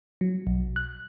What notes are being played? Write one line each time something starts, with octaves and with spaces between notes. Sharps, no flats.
F#3
B1
F#6